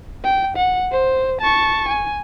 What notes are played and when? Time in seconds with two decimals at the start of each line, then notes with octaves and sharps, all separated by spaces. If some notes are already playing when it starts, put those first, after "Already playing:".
0.24 G5
0.57 F#5
0.92 C5
1.41 A5 C#6
1.88 G#5